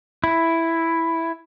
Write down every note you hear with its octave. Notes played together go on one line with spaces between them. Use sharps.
E4